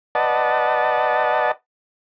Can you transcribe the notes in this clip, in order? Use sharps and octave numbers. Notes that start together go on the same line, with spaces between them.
B4 D5 D#5 F#5 A5